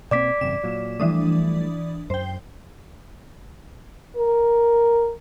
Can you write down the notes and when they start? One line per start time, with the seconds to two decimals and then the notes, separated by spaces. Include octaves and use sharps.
0.11 B2 A#3 C4 D5 D6 B6
0.41 G#1 F#2 C3 E7
0.63 A#2 F#3
1.00 E3 F3 G3 A3 D4 D#6
2.10 F#2 C5 G5
4.16 A#4